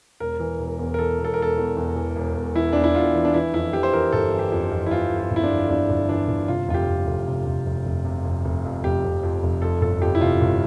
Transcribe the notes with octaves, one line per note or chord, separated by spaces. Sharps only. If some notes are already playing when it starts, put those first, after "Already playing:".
E1 A#4
E3
E1
E2
A#4
E3 A4
E1
A4
A#4
E1 A4
E2
E2
E3
E1
E1
E3 E4
E2 D4
E4
E2 F4
E3
D4
E3 E4
F2 E4
E3 G4
C5
E3 A#4
G1 A4
E3
G4
F2
F2
E4
E3 F4
F2
F4
G1
E4
D4
F2
F2 D4
G1
E3 D4
G1
C3 F4
F1 F4
G4
F1
F1
C3
F1
F1
F1
C3
F1
F1
F2
F1 G4
F1
F2
F1
F2 A4
G1 A4
F2 G4
E4
C3 F4
G1